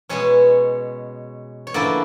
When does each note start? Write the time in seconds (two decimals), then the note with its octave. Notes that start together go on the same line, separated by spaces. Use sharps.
0.09 B2 G#3 C#4 C#5
1.67 C#5
1.74 D3 F3 A#3 C#4 E4 D5